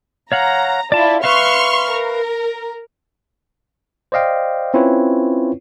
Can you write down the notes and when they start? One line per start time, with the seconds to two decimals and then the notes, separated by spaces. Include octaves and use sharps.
0.32 C#5 F5 F#5 A#5
0.92 E4 F4 D5 A5
1.24 B4 E5 F5 C6 C#6 F6
1.90 A#4
4.12 C5 D5 D#5 F5 G5
4.74 C4 C#4 E4 F4 B4 C#5